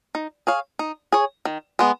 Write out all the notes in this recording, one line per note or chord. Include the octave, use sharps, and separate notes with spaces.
D#4
G#4 C#5 F5
D#4
G#4 C#5
D#3
G#3 B3